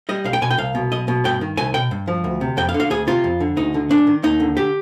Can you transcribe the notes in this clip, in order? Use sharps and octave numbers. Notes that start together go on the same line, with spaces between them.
G3 D#5
B1 F5
G5
B2 G#5
G5
C2 F5
B2
B1 D#5
B2
G2 G5
D#3
C2 G#5
B2 G5
G2
F3
D2
C3
F2 G5
F5
D3
F5
D2 G#4
C3 F4
F2
D3
D2 D#4
D3
G#2 D4
D#3
D#2 D#4
D3
G4